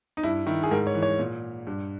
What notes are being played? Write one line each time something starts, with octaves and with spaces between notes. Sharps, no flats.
D#4
G2 E4
D#3 E4
G#4
G#2 A#4
C#5
E3
C#5
A#2
G2